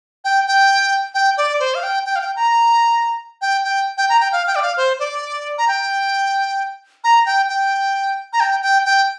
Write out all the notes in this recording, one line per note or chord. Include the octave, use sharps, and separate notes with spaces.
G5
G5
G5
D5
C5
F5
G5
G5
F5
G5
A#5
G5
G5
G5
A#5
G5
F5
G5
D5
F5
C5
D5
A#5
G5
A#5
G5
G5
A#5
G5
G5
G5